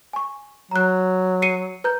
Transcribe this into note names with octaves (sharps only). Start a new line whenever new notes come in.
G#5 C#6
F#3 A#5 F#6
C7 C#7 D#7
B4 A#5 G6